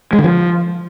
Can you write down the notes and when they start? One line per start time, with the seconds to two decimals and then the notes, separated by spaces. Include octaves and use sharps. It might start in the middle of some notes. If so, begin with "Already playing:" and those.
0.13 G#3
0.19 D3
0.24 F3